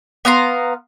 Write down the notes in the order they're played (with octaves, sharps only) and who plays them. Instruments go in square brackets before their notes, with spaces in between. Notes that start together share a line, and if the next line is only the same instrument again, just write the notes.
[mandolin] B3 F5 A#5 C6